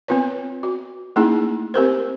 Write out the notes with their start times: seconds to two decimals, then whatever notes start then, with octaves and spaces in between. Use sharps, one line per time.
0.08 B3 C4 F4 B4 C#5
0.63 F#4
1.16 A3 A#3 C#4 D#4 E4 G#4
1.74 C4 G4 A#4 C5